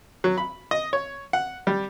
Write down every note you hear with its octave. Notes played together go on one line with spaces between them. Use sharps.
F#3
B5
D#5
C#5
F#5
G3